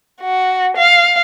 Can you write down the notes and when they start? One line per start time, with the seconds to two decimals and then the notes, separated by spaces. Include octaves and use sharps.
0.21 F#4
0.77 F5